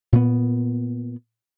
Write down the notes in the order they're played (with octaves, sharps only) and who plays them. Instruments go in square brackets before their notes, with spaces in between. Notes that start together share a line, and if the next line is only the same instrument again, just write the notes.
[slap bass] A#2 B3